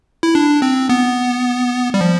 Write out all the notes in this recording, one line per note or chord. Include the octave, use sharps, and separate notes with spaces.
E4
D4
C4
B3
G3
F3